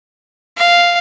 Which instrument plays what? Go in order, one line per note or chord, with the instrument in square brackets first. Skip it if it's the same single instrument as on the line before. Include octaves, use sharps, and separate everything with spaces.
[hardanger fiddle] F5